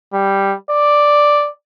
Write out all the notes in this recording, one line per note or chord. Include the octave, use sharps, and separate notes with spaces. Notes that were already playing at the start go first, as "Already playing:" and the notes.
G3
D5